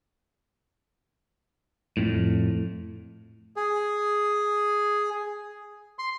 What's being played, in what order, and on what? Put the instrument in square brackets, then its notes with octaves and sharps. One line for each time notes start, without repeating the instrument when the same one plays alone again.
[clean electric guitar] F2 A2
[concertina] G#4
C6